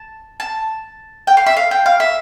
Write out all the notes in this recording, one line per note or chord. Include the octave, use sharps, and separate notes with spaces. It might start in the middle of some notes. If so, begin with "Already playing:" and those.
Already playing: A5
A5
G5
F5
E5
F5
G5
F5
E5